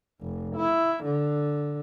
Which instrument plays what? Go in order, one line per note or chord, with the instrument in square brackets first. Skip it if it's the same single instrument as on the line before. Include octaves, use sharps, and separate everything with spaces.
[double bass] F1
E4
D3